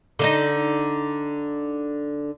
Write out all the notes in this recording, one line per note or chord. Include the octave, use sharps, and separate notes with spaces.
D3 D#4 D#5